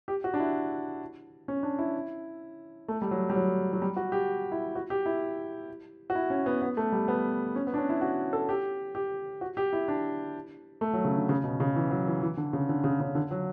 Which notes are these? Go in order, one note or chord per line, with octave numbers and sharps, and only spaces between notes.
G4
F#4
D4
E4
C#4
D4
E4
A3
G3
F#3
G3
F#3
F#3
G3
F#4
G4
E4
F#4
G4
E4
F#4
E4
C#4
B3
B3
A3
G3
B3
C#4
B3
D4
C#4
E4
F#4
A4
G4
G4
F#4
G4
E4
D4
A3
F#3
C#3
D3
C#3
B2
C#3
E3
F#3
E3
E3
D3
C#3
D3
C#3
C#3
D3
F#3